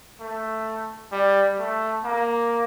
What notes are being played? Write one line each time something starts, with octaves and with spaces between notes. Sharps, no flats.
A3
G3
A3
A#3